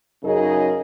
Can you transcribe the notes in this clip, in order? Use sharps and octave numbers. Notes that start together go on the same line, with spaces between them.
F#2 C#3 D#4 G#4 A#4 D#5